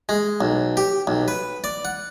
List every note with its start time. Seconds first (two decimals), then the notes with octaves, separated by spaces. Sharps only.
0.09 G#3
0.41 B1
0.77 G4
1.07 B1
1.28 B4
1.64 D5
1.85 F#5